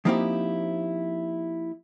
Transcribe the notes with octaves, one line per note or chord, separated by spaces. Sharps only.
F3 A#3 C4 D#4 E4 G4